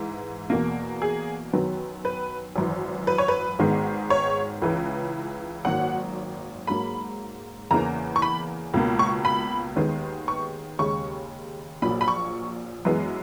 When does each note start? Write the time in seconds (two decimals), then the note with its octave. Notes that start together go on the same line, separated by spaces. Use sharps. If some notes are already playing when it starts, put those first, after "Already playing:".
Already playing: G#2 E3
0.50 E2 B2 A#3
1.02 G#4
1.53 F#2 D#3 F#3 B3
2.05 B4
2.56 G#1 F#2 E3
3.07 B4
3.18 C#5
3.28 B4
3.59 G#1 G#2 D#3 G#3 B3
4.10 C#5
4.62 C#2 C#3 E3
5.65 G#1 F#2 D#3 F#3 A#3 F#5
6.67 G#2 F#3 A#3 B5
7.71 E2 C#3 E3 A#3 A#5
8.16 C#6
8.22 B5
8.74 C#2 B2 A#3
8.99 C#6
9.25 B5
9.76 D#2 D#3 G#3 B3
10.28 C#6
10.79 D#2 C#3 G#3 C#6
11.82 A#1 A#2 F#3 A#3 B5
12.01 B5
12.08 C#6
12.85 F#2 E3 G#3 B3